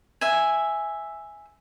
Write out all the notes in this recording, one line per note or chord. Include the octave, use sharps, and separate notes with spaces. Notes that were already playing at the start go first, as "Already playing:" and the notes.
E5 G#5